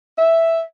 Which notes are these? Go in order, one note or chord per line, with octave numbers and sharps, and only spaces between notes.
E5